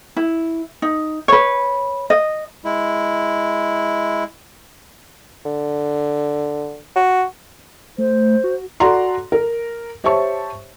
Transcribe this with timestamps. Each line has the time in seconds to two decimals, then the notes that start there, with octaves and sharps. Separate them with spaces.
0.16 E4
0.82 D#4
1.28 B4 C#5
2.10 D#5
2.65 G#3 E4
5.45 D3
6.96 F#4
7.98 A3 C5
8.44 F#4
8.80 F#4 A4 D5 F#5 A#5 C6
9.32 A#4
10.04 G4 C5 C#5 E5 A5 C#6